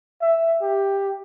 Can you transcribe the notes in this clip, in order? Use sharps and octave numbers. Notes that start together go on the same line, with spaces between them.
E5
G4